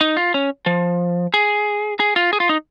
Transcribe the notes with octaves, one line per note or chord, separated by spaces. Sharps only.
D#4
F4
C#4
F3
G#4
G#4
F4
G#4
F4
D#4